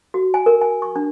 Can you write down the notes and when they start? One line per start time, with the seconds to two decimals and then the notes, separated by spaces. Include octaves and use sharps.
0.14 F#4
0.34 G#5
0.46 A#4
0.62 G#5
0.82 C#6
0.96 D4